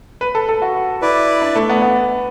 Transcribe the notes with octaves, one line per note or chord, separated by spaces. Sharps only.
B4
A4
A4
F#4
E4 B4 D5
D4
A3
B3
B3